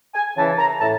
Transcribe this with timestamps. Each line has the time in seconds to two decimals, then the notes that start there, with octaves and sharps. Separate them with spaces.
0.14 G#5
0.36 C#3 E3 A5
0.58 A#5
0.81 A2 A5